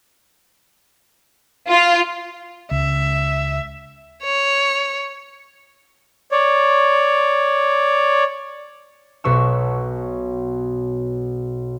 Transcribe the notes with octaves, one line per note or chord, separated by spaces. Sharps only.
F4
C#2 E5
C#5
C#5 D5
B1 B2 F#4 C#6 E6